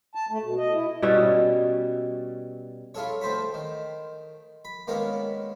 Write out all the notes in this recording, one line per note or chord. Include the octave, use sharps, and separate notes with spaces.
A5
A3
B2
D#5
E4
B2 G3 C#4 E5
E4 F4 G#4 A4 C#5
D2 C4 C5 A5 B5
D#3
B5
D#3 G#3 A#3 B3 C#4 G#4